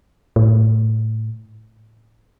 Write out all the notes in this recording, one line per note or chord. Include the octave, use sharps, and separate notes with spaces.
A2